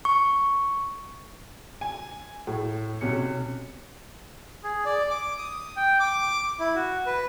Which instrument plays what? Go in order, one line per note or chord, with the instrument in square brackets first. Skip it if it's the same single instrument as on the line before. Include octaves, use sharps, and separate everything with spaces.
[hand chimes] C#6
[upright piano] G#5
A2
B1 C3 C#4 C#7
[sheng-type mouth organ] G#4
D5
D6
D#6
G5
D6
E4
F#4
B4